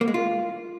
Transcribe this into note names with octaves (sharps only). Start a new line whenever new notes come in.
A#3
G#3
F4